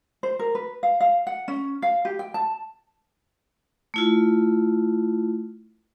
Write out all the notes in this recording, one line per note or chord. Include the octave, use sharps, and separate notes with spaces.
C5
A#4
B4
F5
F5
F#5
C#4
F5
G4
G5
A5
A3 E4 F4